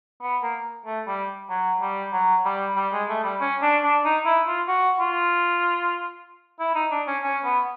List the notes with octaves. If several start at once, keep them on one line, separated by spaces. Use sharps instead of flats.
B3
A#3
A3
G3
F#3
G3
F#3
G3
G3
G#3
A3
G3
C#4
D4
D4
D#4
E4
F4
F#4
F4
E4
D#4
D4
C#4
C#4
B3